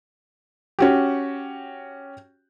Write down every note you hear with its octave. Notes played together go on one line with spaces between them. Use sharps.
C#4 F#4 G4